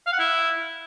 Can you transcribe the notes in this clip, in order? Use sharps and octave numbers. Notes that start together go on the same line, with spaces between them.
F5
F#5
E4